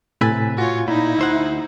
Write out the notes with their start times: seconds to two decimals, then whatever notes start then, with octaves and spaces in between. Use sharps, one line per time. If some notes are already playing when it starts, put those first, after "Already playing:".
0.21 A2 C3 B4 E5 G#5 A6
0.58 F4 F#4 C#5
0.88 A#2 D#4 E4 A#5 B5
1.19 D2 C5 E5 F#5